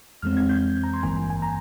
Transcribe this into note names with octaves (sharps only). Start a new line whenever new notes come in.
F2 E3 G#3 C4 F6
G#6
G6
A#5
C6
G#1 G2 E3 A#3 G#5
G#5
A#5